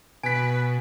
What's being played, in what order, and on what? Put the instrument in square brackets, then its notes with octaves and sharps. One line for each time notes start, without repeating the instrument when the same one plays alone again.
[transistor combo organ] B2 [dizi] B4 [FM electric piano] G#5 [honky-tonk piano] B6 D7